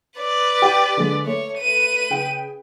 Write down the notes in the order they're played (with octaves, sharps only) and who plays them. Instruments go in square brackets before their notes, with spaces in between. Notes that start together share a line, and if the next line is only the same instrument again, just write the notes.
[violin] B4 D5
[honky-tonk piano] G4 G5
D3 G#3
[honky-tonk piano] A3 [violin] C#5
[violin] B4 D#7
[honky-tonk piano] C#3 G#4 G5